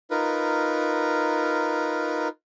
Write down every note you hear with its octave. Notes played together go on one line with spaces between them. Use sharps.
D#4 F4 A#4 B4